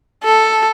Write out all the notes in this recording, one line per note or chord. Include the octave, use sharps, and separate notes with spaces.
A4